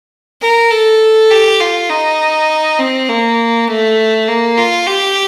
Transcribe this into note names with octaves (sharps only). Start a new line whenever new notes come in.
A#4
A4
G4
F4
D#4
C4
A#3
A3
A#3
F4
G4